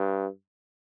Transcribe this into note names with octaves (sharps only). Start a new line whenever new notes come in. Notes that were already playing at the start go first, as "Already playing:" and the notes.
Already playing: G2